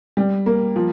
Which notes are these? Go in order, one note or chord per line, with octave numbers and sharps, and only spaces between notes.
G3
A#3
F3